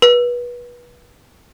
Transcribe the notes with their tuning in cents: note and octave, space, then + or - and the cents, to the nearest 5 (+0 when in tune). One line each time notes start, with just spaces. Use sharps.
B4 -25